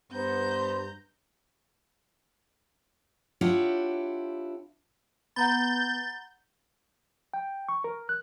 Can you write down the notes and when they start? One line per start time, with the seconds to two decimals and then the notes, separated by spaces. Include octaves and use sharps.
0.12 G2 B3 C5 A#5 G6
3.41 D4 E4 F4 G4 C#5 F#5
5.36 B3 F#5 A#5 B5 G6 A6
7.34 G5
7.69 C#6
7.84 A#4
8.09 F#6